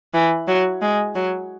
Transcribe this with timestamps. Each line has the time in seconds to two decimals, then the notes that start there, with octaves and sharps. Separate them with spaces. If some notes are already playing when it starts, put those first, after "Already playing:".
0.14 E3
0.47 F#3
0.82 G#3
1.15 F#3